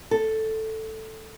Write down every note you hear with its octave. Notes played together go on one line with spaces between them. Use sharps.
A4